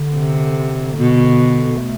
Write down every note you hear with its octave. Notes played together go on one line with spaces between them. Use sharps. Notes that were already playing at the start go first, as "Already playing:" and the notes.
Already playing: D3
C3
B2
A3